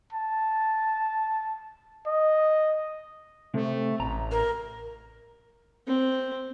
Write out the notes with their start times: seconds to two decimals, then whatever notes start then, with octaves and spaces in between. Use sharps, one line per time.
0.13 A5
2.06 D#5
3.54 C3 A3
4.00 A1 A#5
4.32 A#4
5.87 C4